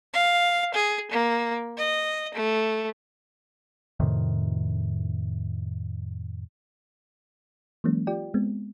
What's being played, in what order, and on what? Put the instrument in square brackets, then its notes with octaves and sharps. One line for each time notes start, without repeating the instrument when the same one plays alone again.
[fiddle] F5
G#4
A#3
D#5
A3
[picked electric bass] F2 A2 C3 D#3
[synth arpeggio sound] E3 F#3 G#3 A#3 C#4
F4 G4 D5 G5
G#3 B3 C4